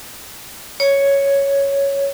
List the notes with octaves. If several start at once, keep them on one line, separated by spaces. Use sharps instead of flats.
C#5